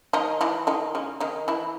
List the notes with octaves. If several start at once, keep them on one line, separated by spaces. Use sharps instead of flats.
D#3 D#4
E3 E4
D#3 D#4
C#3 C#4
D#3 D#4
E3 E4